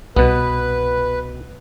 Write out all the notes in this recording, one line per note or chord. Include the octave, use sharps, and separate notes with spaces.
C2 B2 B3 B4